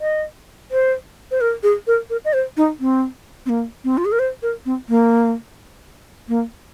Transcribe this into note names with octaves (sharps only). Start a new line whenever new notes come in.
D#5
C5
C5
A#4
G#4
A#4
A#4
D#5
C5
D#4
C4
C4
A#3
C4
F4
G#4
A#4
C5
A#4
C4
A#3
A#3